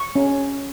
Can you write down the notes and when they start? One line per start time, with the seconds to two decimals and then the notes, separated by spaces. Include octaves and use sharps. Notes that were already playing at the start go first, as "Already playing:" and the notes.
Already playing: C#6
0.16 C#4